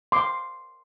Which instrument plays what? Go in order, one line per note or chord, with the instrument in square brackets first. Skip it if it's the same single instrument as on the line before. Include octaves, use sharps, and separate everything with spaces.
[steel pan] C6 D6